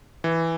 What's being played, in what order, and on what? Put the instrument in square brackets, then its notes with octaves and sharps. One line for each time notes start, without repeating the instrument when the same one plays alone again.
[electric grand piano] E3